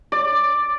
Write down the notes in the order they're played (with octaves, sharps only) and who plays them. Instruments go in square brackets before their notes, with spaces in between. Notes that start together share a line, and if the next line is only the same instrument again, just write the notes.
[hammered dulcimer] D5